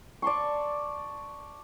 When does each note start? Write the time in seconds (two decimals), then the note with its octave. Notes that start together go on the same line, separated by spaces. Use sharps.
0.22 D5 A5 C6 C#6